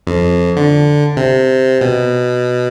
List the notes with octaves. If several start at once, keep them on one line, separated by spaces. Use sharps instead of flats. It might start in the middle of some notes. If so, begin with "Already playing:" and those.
F2
D3
C3
B2